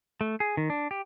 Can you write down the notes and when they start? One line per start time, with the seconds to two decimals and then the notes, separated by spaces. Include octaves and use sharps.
0.21 A3
0.40 G#4
0.57 D#3
0.70 D4
0.91 G4